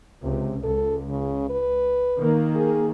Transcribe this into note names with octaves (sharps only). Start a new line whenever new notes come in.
C#2 C3
C#2 A4
C#3
B4
D#3 A#3
G#4